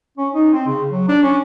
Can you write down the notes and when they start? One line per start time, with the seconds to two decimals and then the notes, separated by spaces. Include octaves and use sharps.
0.18 C#4
0.34 D#4
0.53 C4
0.68 C#3
0.91 F#3
1.09 D4
1.23 C#4